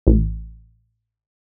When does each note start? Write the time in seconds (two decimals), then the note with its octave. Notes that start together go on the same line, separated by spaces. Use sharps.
0.07 A1